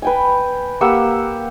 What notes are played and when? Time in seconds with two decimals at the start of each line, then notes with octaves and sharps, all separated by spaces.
0.02 B4 G5 G#5
0.81 A#3 G4 F#5 E6